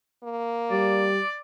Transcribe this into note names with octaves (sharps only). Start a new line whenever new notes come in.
A#3
G3 D5